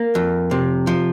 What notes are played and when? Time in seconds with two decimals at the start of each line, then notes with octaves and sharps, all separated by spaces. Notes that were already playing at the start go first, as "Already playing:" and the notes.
Already playing: A#3
0.15 F2
0.51 C3
0.87 F3